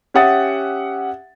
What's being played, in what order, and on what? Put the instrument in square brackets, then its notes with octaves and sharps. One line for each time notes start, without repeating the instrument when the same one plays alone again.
[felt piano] C#4 G4 E5 F#5 D#6 A6